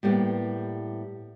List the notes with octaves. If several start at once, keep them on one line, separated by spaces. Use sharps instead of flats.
A2 G3 A#3 B3